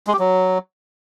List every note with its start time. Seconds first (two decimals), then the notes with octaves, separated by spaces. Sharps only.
0.07 G#3
0.13 G4
0.19 F#3